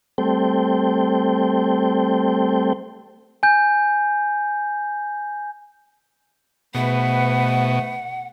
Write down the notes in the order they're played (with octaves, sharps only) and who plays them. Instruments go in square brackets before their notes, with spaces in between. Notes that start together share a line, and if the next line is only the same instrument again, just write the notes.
[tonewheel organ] G3 A3 C4 A4 C5 G5
[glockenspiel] G#5 G6
[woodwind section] G#2 A3 B4 [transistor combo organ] B2 [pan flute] F#5